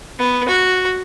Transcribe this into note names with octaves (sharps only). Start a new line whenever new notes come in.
B3
F#4